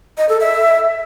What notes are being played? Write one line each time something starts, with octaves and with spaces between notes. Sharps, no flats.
D#5
A4
E5